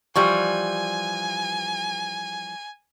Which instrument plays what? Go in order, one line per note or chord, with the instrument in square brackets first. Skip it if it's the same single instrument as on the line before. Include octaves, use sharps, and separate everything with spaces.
[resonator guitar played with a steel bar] E3 F3 G3 [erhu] G#5 [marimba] C#6